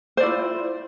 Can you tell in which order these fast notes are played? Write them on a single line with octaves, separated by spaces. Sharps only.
C5 D5 E4 F4